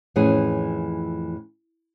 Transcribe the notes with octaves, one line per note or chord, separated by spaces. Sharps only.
F2 A2 E3 C#4 G#4